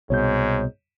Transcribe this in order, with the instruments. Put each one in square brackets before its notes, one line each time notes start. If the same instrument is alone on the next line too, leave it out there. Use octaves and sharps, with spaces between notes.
[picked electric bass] C2 B2 [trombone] G#2 [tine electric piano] C#5 G6